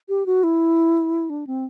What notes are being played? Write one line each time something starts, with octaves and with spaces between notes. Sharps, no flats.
G4
F#4
E4
D4
C4